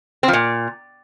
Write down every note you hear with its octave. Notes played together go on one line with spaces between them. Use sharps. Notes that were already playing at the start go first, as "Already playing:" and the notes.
C4
F3
A#2